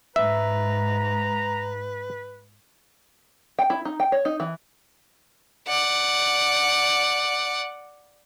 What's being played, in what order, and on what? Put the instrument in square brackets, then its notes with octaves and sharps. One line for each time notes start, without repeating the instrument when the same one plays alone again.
[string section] G#2 [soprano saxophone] B4 [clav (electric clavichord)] E5 [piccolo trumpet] A#5
[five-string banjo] G5
E4
D#4
G5
C#5
D#4
E3
[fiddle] D5 F#5